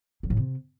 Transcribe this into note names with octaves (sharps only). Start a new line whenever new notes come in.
F#3
A2
C3